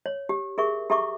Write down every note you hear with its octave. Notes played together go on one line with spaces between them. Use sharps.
C#5
G4
G#4 A#4 E5 C#6
G4 A4 E5 A#5 C#6 D6